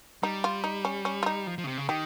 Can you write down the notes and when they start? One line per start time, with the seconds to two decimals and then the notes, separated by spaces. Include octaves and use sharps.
0.23 G3 D#4
0.44 F4
0.64 D#4
0.85 C#4
1.05 C#4
1.23 F4
1.26 D#4
1.47 F3
1.58 F3
1.64 C#3
1.67 C3
1.78 C#3
1.89 D#3 G4